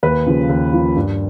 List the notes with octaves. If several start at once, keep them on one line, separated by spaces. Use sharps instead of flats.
D#2 B4
C#3 F3
D#2
C#3 F3
G2